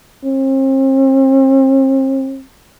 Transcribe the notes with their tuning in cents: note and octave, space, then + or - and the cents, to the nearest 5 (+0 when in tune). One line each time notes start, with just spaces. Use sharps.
C4 +40